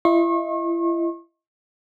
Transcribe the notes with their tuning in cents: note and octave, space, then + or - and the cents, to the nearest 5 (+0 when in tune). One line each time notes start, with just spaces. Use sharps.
E4 +40 D#5 +15 C#6 -40